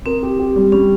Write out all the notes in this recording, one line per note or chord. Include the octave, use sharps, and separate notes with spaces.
C4 A#4
G4
G4
G3
G3 C#4